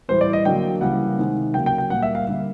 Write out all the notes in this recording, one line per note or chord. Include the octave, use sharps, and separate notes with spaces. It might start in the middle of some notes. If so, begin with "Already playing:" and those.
A2 E3 G3 C5
D5
D#5
D3 F#3 A#3 G5
C#3 E3 G3 A#3 F#5
C3 D#3 G#3
C#3 F#3 A#3 G5
G5
G5
A#2 G3 A#3 F#5
E5
F5
D3 G3 A#3